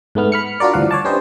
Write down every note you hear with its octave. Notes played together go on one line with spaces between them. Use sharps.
G#2 A3 B3 F6
B5 F6 C#7
D4 F4 F#4 A#4 D5
D2 G2 E3 F3 F5 F#5
C#5 D5 A5
C#4 D4 G4 B4 C5 D#5